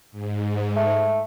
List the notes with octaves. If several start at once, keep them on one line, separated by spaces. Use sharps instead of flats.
G#2
A3